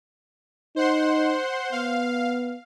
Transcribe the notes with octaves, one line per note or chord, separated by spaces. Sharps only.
D#4 C5 F#5 C6
B3 F5